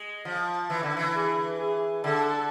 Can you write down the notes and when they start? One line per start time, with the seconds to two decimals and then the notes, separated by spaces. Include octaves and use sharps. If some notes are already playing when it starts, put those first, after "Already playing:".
Already playing: G#3
0.25 F3
0.70 E3
0.83 D3
0.97 E3
1.15 G#4
1.59 G#4
2.04 D3 A4